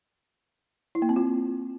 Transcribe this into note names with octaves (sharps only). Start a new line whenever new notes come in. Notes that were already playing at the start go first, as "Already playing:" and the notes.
E4
A#3
C4
F4